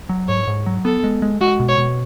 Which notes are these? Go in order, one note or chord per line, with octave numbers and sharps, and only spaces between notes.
F#3
G#2 C#5
G#2
F#3
B3 A4
G#3
G#3
G#3 F#4
B2
C#5
B2